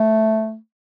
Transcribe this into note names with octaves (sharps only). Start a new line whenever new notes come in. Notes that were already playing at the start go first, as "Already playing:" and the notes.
Already playing: A3